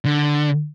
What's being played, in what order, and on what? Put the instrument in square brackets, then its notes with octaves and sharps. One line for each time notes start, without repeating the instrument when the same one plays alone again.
[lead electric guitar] D3